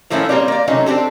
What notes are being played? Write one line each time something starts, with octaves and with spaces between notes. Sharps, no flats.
A2 F3 A3 A#3 C#4 E4
G3 A#3 C4 C#5 D5
A#3 D5
C3 F#3 A3 C#4 D#4
C4 D4 G4 A4